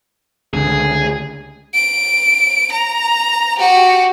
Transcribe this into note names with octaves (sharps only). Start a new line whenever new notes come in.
C#2 D3 G#4
D7
A#5
F#4 G4